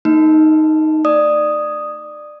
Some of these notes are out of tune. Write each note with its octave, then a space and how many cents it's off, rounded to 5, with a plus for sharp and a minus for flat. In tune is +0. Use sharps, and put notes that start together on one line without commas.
A#3 -45 D#4 +0
D5 +20 D#6 +0